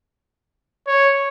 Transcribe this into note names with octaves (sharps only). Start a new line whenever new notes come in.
C#5